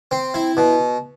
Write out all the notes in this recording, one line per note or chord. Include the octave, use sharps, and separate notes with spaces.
C4
E4
B2